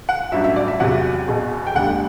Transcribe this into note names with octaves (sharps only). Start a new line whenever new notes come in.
F#5
A1 G2 F#3 E5
E5
D5
E5
E2 C3 F#3 F#5
E1 E2 B2
G5
E1 D2 D3 G3 F#5